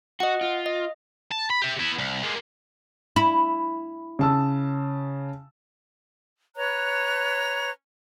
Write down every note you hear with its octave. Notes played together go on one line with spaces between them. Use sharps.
F#4 D#5 F#5
F4
D#5
A5
B5
G4 E5
B3 E4
C2
G#3 A#3
E4
C#3 A5 E6
B4 C#5 A#5 F#6